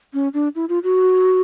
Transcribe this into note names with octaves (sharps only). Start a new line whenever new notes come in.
C#4
D4
E4
F4
F#4